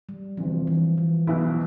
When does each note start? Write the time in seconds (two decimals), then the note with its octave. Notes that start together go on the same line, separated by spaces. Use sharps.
0.09 G3
0.37 E1 D2 C3 F3
0.67 E3
0.98 E3
1.27 B1 B2 F3 B3 E4